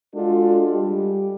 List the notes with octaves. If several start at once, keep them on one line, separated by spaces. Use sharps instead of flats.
G#3 D4 F4 F#4 A4
G3 G#3 G4